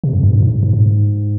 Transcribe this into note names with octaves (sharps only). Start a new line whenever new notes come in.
C3
F2
G2
G2
G#2
G#2
G#2